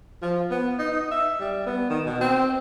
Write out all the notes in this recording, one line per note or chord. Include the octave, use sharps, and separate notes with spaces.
F3
B3
D#4
D#4
E5
G3
B3
D#3
B2
C4